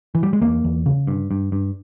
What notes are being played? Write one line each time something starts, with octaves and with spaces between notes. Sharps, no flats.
E3
G3
G#3
E2 A#3
E2
C#3
G2
G2
G2